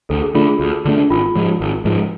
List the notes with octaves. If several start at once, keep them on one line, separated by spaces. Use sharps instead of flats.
D2 A4
G#4
D3 A3 D4 F4
G#4
D2
D3 A3 D4
G#1 F4
G#2 F3 G#3
G#1
G#2 F3 G#3